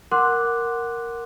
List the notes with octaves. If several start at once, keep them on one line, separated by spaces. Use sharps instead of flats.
A#4 F#5 C6 D6 F#6